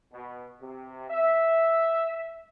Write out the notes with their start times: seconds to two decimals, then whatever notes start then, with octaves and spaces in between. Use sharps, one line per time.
0.12 B2
0.60 C3
1.10 E5